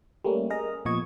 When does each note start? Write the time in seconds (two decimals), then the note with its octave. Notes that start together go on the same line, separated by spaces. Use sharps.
0.24 G3 A3 A#3 C#4
0.50 G#4 A#4 D#5 A#5
0.85 A#2 F3 B3 D#5 C#6 G#6